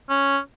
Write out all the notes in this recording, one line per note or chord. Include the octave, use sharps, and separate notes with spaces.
C#4